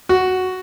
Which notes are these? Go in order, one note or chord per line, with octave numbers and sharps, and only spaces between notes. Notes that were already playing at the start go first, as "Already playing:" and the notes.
F#4